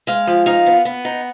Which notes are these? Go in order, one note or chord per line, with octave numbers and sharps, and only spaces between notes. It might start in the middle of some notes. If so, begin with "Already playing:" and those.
G#3 F5
F3
D#4 F5
B3
B3
D#4